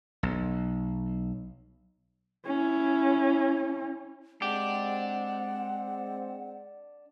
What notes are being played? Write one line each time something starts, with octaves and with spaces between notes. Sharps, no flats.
B1
C#4 E4
G#3 C4 D4 G4 F#5